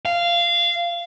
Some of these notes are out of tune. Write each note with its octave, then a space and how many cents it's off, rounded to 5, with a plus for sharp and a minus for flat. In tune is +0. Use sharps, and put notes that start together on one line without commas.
F5 -15